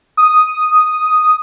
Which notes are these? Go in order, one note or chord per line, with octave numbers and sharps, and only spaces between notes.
D#6